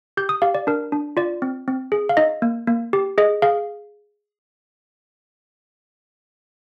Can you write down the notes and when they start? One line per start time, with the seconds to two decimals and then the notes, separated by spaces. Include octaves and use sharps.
0.17 G4 G6
0.29 D#6
0.42 G4 F5
0.55 D5
0.67 D4 A#4
0.92 D4
1.17 F4 D5
1.42 C4
1.68 C4
1.92 G#4
2.09 F5
2.17 D#4 D#5
2.42 A#3
2.67 A#3
2.93 G4
3.18 G#4 D#5
3.42 G#4 F5